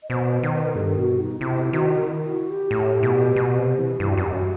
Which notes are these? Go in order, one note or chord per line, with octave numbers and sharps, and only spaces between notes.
D#5
B2 C5
D#3 C5
B4
G2 A4
B2 F#4
D#4
C3 E4
D#3 F#4
E4
F#4
G4
A2
B2
B2
C3
E3
G2 G4
F#4
F#2 G4
F#4